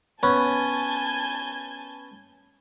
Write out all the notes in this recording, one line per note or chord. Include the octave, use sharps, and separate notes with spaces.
B3 C#4 G#5 A5 G6